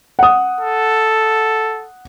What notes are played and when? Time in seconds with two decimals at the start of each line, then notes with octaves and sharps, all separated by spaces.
0.19 F#5 D#6
0.61 A4